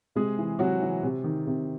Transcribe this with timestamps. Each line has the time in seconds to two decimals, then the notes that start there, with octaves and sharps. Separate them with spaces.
0.15 C3 G#3 G#4
0.38 E3
0.59 C3 F#3 F#4
0.82 E3
1.03 C3
1.24 D#3
1.47 C3